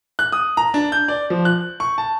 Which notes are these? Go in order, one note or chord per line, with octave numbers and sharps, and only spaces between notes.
F#6
D#6
A#5
D4
G6
D5
F3
F#6
C#6
A5